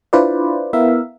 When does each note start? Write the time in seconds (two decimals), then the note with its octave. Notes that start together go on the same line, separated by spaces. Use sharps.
0.13 D4 E4 F4 B4 C5 D5
0.73 B3 E4 A#4 E5 F5